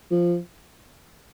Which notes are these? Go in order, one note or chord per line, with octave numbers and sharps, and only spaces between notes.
F3